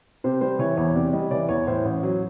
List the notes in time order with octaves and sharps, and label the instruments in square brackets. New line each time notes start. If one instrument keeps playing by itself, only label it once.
[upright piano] C3 C5
G3 C5
E3 C#5
E2 C#5
C3 D5
G3 D#5
E3 D5
E2 C#5
A2 C5
A1
F#3